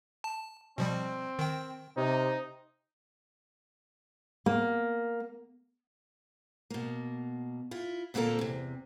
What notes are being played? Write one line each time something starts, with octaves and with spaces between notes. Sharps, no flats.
A5
B2 F3 G3 C4
D#3 G5
C3 D#4
A#3
B2 A#3
E4 F4
D2 A#2 A#3 C4 A4 A#5
E2 C3